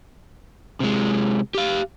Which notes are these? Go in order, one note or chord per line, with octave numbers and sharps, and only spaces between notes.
C3 G#3
G4 F5